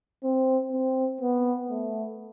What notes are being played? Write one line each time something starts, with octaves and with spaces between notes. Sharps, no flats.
C4
C4
B3
A3